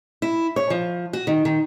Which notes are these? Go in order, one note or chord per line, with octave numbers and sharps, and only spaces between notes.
E4
C#5
F3
F#4
D#3
D#3